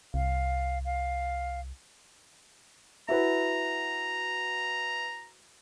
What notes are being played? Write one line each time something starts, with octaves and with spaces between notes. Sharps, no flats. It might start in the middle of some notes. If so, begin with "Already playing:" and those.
C2 F5
F5
E4 F#4 B4 A#5